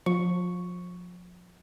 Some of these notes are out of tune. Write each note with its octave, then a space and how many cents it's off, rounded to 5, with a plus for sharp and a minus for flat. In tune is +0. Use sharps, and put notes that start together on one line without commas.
F3 +30 C#6 +0